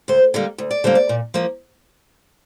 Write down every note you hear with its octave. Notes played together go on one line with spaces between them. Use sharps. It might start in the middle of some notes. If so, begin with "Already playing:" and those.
D2 C5
D3 G3 A#3
D2
D5
D3 G3 A#3 C5
D5
A#2
F3 A#3